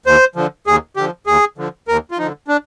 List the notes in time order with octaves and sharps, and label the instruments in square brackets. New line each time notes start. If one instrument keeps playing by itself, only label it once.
[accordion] D#2 C5
D3 F3
D#2 G#4
D3 F3 G4
D#2 G#4
D3 F3
D#2 A#4
F4
D3 F3 D#4
D4